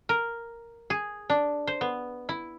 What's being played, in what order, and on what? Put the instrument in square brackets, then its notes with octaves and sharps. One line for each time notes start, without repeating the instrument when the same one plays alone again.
[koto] A#4
G#4
D4
C5
B3
E4